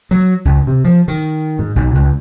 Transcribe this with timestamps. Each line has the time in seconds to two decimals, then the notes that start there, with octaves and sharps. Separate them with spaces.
0.11 F#3
0.45 C#2
0.67 C3
0.84 F3
1.08 D#3
1.59 G#2
1.76 B1
1.95 C#2